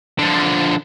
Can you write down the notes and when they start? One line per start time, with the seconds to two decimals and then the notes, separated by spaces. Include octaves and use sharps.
0.19 D3 F3